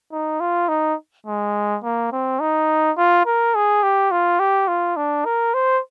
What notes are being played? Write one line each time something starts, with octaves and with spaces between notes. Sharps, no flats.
D#4
F4
D#4
G#3
A#3
C4
D#4
F4
A#4
G#4
G4
F4
G4
F4
D4
A#4
C5